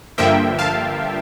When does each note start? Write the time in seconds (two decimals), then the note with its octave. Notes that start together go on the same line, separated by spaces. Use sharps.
0.18 G2 D3 F3 A#3 E5 G5
0.59 F5 A5